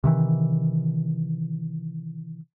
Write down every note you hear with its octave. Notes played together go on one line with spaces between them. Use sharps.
C3 D#3 E3